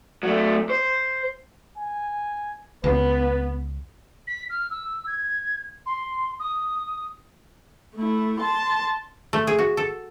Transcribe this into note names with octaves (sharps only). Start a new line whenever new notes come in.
F#3 A3
C5
G#5
C#2 B3 B4
B6
F6
E6
G#6
C6
D#6
A3 E4
A5 C6
A3
G#4
F#4
A4